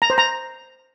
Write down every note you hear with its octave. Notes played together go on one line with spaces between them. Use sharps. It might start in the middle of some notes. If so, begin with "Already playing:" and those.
A#5
C5
A#5